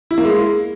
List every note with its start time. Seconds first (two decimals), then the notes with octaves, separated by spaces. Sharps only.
0.11 E4
0.18 A#3
0.25 G#3